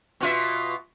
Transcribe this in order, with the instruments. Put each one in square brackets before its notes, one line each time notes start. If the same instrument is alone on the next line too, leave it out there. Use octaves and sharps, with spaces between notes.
[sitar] B2 F4 E5